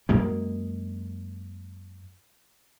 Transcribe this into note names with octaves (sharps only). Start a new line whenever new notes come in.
F#2 G#3 A#3